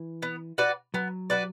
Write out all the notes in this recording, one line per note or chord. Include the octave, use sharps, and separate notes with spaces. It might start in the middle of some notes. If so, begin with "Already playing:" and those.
Already playing: E3
B3
F#4 B4 D5
F#3 B3
F#4 B4 D5